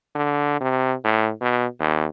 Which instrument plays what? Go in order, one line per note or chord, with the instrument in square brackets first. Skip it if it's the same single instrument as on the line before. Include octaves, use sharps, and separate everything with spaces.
[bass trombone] D3
C3
A2
B2
D#2